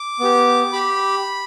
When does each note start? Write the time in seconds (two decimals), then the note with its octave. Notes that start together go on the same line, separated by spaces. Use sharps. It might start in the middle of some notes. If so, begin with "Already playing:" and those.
Already playing: D6
0.20 B3 G4
0.73 G4 B5